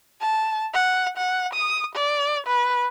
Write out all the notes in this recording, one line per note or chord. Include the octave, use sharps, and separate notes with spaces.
A5
F#5
F#5
D#6
D5
B4